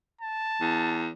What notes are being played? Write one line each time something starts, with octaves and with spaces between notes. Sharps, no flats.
A5
E2